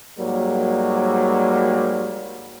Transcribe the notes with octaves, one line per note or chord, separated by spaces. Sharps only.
G#2 F#3 G3 A#3